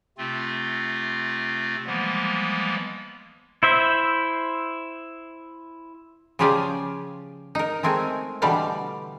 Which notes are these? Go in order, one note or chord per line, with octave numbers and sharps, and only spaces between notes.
C3 A3 C4 F4
E3 F3 G3 G#3 A#3 B3
E4 C5 E5
C#3 F3 F4 G4 G#4 D5
D#4 A#4
G#3 A3 C4 A#4 G#5
B2 D3 E3 G3 D5 F5